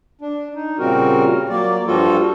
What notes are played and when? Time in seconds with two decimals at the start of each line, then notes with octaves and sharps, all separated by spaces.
0.21 D4
0.55 D#4
0.79 A#2 C#3 G3 C4 F#4 A#4
1.50 F#3 A#3 D5
1.87 G2 F3 G3 F4 F#4 A4